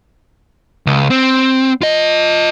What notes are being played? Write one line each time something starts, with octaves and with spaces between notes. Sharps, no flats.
C#2
C4
F4 D#5